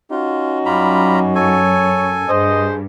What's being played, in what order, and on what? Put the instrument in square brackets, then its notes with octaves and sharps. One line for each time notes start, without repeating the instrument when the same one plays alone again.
[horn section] C#4 D#4 F#4 [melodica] F4
[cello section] F#2 [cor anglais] G3 [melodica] F4 A#5 B5
[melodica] A4 G#5 [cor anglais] C#5
[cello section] G2 [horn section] G#4 C5 [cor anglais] D#5